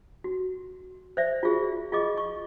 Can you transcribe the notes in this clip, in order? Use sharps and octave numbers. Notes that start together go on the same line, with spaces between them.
F#4
C5 D5 E5
F4 F#4 G#4
F4 G#4 D#5 D6
C#6